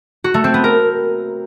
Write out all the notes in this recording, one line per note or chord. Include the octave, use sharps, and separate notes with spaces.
F#4
A3
C4
B3
A#4